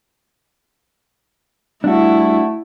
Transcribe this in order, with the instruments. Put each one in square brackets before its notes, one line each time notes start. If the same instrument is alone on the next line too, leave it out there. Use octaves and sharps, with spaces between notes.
[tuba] G3 [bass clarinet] A3 [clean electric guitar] D4 F#4 [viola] E4